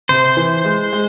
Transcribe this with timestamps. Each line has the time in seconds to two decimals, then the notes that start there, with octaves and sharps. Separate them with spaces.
0.09 C3 C5
0.37 E3
0.65 G#3
0.93 G#3